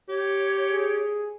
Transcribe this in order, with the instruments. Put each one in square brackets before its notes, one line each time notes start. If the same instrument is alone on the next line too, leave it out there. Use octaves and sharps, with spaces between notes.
[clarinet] G4 [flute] C#5
[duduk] G#4